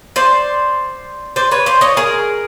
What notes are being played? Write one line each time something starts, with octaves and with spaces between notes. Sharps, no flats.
C5 D5
C5 D5
B4 C#5
C5 D5
C#5 D#5
G#4 A#4